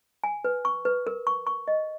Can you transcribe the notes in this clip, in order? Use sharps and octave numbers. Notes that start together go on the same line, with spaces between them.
G#5
B4
C#6
B4
A#4
C#6
C#6
D#5